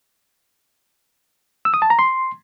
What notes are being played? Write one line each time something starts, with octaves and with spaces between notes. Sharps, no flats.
E6
D#6
A5
A#5
C6